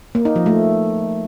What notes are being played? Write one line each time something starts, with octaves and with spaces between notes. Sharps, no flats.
A#3
D#4
F3
A3